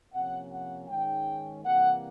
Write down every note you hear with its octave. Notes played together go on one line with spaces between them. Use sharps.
C3 F3 A#3 C#4 F#5
F#5
G#2 D#3 G#3 C#4 G5
C3 E3 G3 A#3 F#5